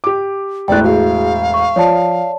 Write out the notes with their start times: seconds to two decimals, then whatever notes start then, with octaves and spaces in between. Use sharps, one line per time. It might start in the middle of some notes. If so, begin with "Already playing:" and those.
0.04 G4 D6
0.68 E1 A2 D5 G5 F#6
0.84 F#4 G#4 F5
1.54 C#6
1.76 F3 C#5 D5 A5